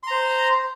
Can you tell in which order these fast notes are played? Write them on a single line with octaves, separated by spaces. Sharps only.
C6 A#5 C5